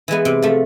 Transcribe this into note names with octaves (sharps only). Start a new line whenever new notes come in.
E3 G#3 B3
C3
F3 A3